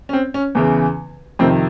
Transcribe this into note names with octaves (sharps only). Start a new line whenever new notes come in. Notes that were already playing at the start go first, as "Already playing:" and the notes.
C#4
C4
C#4
E2 C#3 E3
F2 C3 D#3 C4